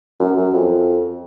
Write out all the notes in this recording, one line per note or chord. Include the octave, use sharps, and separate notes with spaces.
F#2
F#2
F2